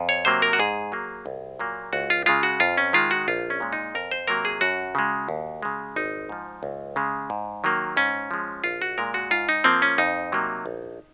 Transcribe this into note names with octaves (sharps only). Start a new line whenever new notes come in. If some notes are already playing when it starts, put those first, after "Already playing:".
Already playing: F2
C#5
C3 F#3 A#3 C5
A#4
F#4
G#2 G#4
F#3 A#3
C2
A#2 F#3 A#3
C#2 F#4
F4
C#3 G#3 F4
F#4
F2 F4
C#4
D#3 G#3 F4
F#4
A#1 F4
C#4
A#2 G#3
D#4
F2 A#4
C5
C3 F#3 A#3 A#4
G#4
F#2 F#4
C#3 G#3
D#2
C#3 G#3
G#1 D#4
G#2 F3
C#2
C#3 G#3
G#2
D#3 F#3 A#3
G#2 C#4
F3 G#3
A#1 F4
F#4
A#2 G#3 A#4
F#4
G#2 F4
D#4
F3 A#3 C4
C#4
F2 D#4
C3 F#3 A#3
A#1